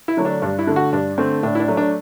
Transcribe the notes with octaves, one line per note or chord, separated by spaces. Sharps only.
E4
D3 F#3 A3
D4
G2 D4
E4
D3 A3
F#4
G2 D4
D3 A3 C4
A2 D4
E4
D4
F#3 A3
D4